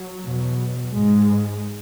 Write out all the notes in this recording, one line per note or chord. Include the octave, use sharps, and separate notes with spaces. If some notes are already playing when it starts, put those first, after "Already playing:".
Already playing: F#3
E2 B2
G#2 G#3